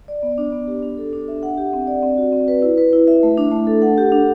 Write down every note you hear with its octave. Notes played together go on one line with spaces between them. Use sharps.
D5
B3
D4
B3
G4
D4
A4
D4
E5
F#5
G4
C4
D5
C4
F#4
C4
B4
E4
B4
E4
E5
A3
D4
A3
A4
F#5
G4
D4